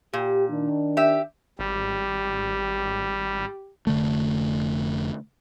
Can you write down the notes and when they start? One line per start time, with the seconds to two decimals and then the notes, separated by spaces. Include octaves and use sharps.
0.13 A#2 G4
0.49 D#3 D4
0.97 G4 E5
1.59 G#1 G3 G4
3.87 F1 D3 A3